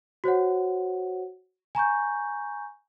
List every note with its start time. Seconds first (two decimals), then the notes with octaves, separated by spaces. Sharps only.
0.24 F#4 C5 C#5 F#5
1.75 G#5 A#5 C#6 G6